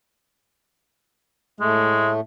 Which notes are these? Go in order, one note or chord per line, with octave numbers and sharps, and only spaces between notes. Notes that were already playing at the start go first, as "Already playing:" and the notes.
A2 G#3 A3